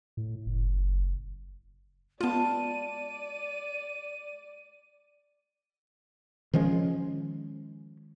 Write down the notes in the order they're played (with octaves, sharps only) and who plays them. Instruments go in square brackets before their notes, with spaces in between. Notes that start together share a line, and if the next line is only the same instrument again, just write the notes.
[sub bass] A2
F#1
[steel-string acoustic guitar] G#3 A5 [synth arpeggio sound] B3 F4 [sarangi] D5 [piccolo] D#7
[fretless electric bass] D#3 F3 G#3 C#4